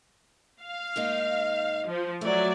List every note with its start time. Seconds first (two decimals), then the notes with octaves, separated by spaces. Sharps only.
0.61 F5
0.96 G#2 A#3 D#4
1.88 F3
2.21 F#3 A3 D5